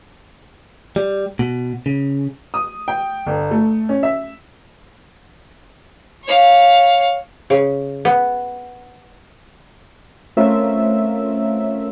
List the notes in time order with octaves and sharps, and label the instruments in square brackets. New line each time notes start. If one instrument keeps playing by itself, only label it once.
[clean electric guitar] G3
B2
C#3
[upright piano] D#6
G5
G1
A3
C#4
E5
[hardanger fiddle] C#5 F5
[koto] C#3
B3
[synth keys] A3 C4 C#4 F4 A#4 E5